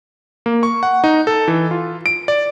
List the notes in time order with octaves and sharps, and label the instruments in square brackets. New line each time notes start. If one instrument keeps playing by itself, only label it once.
[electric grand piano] A#3
C#6
F#5
D#4
A4
E3
F4
D7
D5